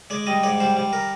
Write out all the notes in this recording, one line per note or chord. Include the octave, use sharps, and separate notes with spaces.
G#3 D5
G3 D#5
G#2 D5
G3 C5
G3
A#4